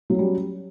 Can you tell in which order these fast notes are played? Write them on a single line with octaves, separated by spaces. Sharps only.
F#3 C#4 G3